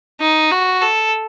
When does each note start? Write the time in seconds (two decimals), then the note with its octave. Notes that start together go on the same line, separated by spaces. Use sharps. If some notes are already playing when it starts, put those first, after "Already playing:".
0.21 D#4
0.51 F#4
0.82 A4